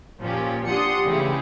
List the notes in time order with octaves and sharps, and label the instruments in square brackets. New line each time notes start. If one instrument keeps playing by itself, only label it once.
[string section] A#2 F3 C#4 G4
D4 G4 F#5 C6 D#6 C#7
C#3 E3 A3 E4 G4 G#4